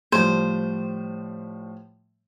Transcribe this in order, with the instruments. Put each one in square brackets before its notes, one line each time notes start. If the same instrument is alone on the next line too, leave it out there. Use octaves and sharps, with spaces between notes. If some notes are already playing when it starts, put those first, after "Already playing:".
[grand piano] A2 F3 G3 [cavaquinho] C5